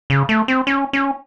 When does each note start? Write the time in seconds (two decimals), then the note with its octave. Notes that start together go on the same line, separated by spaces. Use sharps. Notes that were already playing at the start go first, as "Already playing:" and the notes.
0.10 C#3
0.29 A3
0.48 C4
0.67 C#4
0.93 C#4